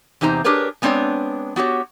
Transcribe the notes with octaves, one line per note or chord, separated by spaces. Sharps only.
E2 C3 D#4 C5 A#5
D4 G4 G#4 A#4 B4 C#5
G#3 B3 C4 D4 C#5 D5
B3 F#4 G4 C#5